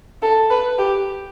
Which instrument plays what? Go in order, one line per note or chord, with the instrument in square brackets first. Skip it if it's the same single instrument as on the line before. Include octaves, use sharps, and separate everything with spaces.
[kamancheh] A4
B4
G4